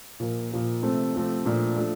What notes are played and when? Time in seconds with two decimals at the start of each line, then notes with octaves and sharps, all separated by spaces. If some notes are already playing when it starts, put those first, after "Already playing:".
0.20 A#2 F3 A#3
0.51 A#2 F3 A#3
0.82 C3 F3 A3 C4
1.14 C3 F3 A3 C4
1.45 A#2 F3 A3 D4
1.76 F3 A3 D4